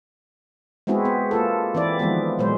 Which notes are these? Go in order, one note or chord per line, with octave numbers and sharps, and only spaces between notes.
G#3 B3 C4 E4 F#4 G#4
B3
A#3 F4 A4
E3 C4 E4 D5
D#3 F3 G#3 B3
A#2 F#3 G#3 C5